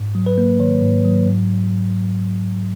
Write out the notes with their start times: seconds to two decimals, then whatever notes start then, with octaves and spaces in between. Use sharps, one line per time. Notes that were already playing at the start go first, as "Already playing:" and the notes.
Already playing: G#2
0.15 F#3
0.26 B4
0.38 A#3
0.59 D#3 C#5
0.82 G#2
1.05 F#3
1.27 G#2